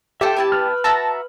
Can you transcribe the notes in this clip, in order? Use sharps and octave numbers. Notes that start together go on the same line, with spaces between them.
F4 G4 A4 C5 E5 G5
B3 E4 A5
B4 F6
F#4 E5 A5 A#5